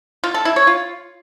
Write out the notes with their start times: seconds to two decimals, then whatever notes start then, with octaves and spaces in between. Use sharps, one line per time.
0.24 F4
0.34 A4
0.45 E4
0.56 C#5
0.67 F4